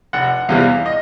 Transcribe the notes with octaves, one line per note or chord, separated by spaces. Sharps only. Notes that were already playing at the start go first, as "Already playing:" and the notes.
F1 F#5
E2 C3 E3 G3 F5
D#5